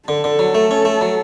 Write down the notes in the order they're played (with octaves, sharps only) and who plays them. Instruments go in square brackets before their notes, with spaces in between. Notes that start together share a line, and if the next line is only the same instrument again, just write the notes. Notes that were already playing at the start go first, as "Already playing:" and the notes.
[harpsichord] D3 [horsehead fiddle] A4
[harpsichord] D3
F#3
A3
C#4
A3
F#3